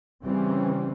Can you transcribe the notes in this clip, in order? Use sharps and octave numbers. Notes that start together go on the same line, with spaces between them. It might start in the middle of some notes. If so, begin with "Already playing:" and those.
C#3 E3 G3 C4 C#4